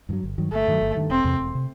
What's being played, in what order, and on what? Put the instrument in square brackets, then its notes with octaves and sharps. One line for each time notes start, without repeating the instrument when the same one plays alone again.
[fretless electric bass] G2 D#3
F#3
G1
G2 D#3 F#3
[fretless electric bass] G1 [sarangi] A3
[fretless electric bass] G2 D#3 F#3
G1
G2 D#3 F#3
[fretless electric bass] E1 [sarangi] C4
[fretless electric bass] E2 C3
E1
C3